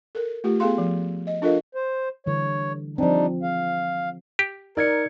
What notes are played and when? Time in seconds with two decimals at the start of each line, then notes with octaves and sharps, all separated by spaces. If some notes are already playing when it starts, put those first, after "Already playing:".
0.15 A4 A#4
0.44 A3 F4 G4
0.60 B3 G#4 A4 F5 C6
0.78 F3
1.27 D#5
1.42 D4 F4 A4 A#4 D#5 F5
1.75 C5
2.26 D3 E3 G3 C#5
2.98 F3 G3 C4 D4 D#4
3.43 G#4 F5
4.39 G4
4.77 D#4 A#4 D5 G#6 C#7